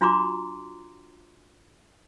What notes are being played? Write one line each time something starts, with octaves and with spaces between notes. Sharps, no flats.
D4 F4 F#4 A#5 C6 D6